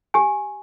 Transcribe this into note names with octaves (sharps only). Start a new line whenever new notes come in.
G4 G#5